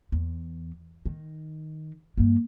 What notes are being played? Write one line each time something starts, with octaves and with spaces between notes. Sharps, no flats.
E2
D#3
G2 A#3